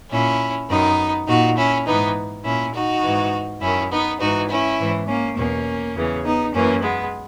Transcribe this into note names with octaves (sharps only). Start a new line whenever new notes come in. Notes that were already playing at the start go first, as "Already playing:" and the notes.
A#2 C#4 E4
F#2 D#3 B3 D#4
A#2 D#4 F#4
C#4 E4
G#2 E3 B3 D#4
A#2 C#4 E4
D#4 F#4
G#2 E3
F#2 D#3 C#4 E4
B3 D#4
G#2 E3 D#4 F#4
C#4 E4
G#2 E3
A#3 C#4
E2 B2 A#3 C#4
E2 C#3 E3
B3 D#4
F#2 E3 A#3 C#4
G#3 B3